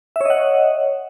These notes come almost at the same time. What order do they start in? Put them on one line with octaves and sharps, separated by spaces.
E5 C#5 D#5 F#5